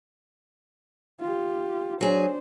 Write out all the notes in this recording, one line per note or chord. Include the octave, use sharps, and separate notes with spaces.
F4 G4
F#3 D4 G#4 C5